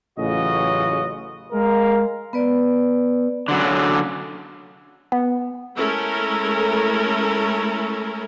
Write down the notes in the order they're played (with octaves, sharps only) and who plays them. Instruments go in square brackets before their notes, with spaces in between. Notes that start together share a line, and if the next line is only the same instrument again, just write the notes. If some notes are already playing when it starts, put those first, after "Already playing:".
[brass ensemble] A1 C#3 F#3 F4 F#4 D#5
G#3 A#4 F5
[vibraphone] B3 B4 D5
[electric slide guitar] D3 F#3 C#4
[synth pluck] B3
[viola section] G#3 A3 C#4 E4 A4 A#4